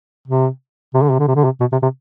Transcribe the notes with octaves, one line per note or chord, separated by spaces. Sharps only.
C3
C3
D3
C3
D3
C3
D3
C3
B2
C3
C3